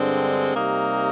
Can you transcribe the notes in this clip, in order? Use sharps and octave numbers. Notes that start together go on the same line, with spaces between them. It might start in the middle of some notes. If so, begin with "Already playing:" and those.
Already playing: G2 D3 G#3 C4
C3 G3 A#3 D#4